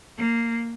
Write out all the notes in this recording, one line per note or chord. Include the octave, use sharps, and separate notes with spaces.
A#3